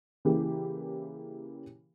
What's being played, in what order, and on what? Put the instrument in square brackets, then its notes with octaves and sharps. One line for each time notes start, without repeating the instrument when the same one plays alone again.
[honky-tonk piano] C#3 E3 A#3 G4